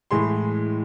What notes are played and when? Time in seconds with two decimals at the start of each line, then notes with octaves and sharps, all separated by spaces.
0.11 A2 E3 G#3 C6